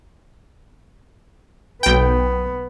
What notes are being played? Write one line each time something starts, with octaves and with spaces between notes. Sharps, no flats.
B1 B3 G5